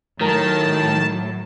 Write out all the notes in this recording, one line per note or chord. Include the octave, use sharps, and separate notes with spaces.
A2 D#3 F#3 A#4 A5